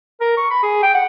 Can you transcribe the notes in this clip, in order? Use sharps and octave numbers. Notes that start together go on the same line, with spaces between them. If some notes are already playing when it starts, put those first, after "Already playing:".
A#4
C#6
B5
G#4
G5
F#5